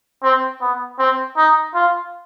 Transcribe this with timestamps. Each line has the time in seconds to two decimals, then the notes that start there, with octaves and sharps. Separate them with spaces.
0.23 C4
0.61 B3
0.99 C4
1.37 D#4
1.75 F4